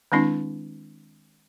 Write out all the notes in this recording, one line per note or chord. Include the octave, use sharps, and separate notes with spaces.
D#3 G#3 C4 D4 E4